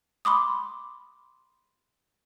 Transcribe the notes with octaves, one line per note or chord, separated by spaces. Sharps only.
B5 C6 D6 D#6